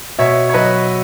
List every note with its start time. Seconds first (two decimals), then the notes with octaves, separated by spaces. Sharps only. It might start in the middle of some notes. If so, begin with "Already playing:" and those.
0.19 B2 C#5 E5
0.49 C#5
0.54 F#3 B4 D#5